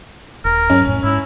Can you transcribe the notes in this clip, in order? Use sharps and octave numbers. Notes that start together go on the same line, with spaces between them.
D#1 A#4
G2 F#3 C#4
F2 A2
G#2 E4